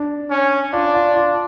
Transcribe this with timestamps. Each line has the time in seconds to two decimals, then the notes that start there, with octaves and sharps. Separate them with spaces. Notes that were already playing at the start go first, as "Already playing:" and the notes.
Already playing: D4
0.31 C#4
0.73 D4 F4
0.95 F4
1.16 F4